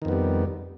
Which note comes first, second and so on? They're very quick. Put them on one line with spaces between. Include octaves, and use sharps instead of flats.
D#3 F2 B3 G3